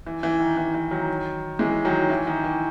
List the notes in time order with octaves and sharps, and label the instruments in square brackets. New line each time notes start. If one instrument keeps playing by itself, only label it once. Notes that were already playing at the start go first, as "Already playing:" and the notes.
[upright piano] E3
E3
D#3
E3
E3
D#3 F#3
E3 G#3
D#3 F#3
E3
D#3
E3